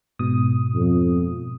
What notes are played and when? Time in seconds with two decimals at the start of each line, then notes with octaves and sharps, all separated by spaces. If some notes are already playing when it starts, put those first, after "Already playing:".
0.19 G#2 B2 D#6
0.74 F2